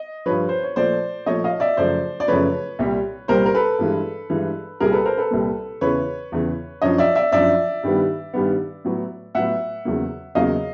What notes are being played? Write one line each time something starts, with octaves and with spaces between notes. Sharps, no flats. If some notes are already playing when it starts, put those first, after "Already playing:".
Already playing: D#5
G2 D3 F3 B4 C#5
C5
C#5
A#2 F3 A3 C5 D5
A#2 F3 A3 C#5 D#5
D#5 F5
D5 E5
F#2 C#3 F3 A3 C5 D5
D5
F#2 C#3 F3 A3 B4 C#5
C2 A#2 G3
C2 A#2 G3 A#4 C5
A#4
A4 B4
G2 E3 G#3
G2 E3 G#3
C2 A#2 G3 A#3 G#4 A#4
A4 B4
A#4 C5
A4 B4
C2 A#2 G3 A#3
E2 C#3 E3 B4 C#5
E2 C#3 E3
F#2 D3 F3 C#5 D#5
D5 E5
D5 E5
F#2 D3 F3 D5 E5
G2 D#3 G3 B3
G2 D#3 G3 B3
A2 F#3 B3
A2 F#3 B3 E5 F#5
E2 C#3 F#3 A#3
E2 C#3 F#3 A#3 D#5 F5